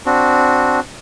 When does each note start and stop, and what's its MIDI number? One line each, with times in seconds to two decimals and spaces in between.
0.06 0.80 60
0.06 0.80 62
0.06 0.80 66